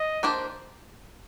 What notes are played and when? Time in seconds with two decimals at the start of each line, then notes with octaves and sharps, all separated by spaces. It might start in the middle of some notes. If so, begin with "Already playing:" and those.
Already playing: D#5
0.23 A#3 D4 G4 C5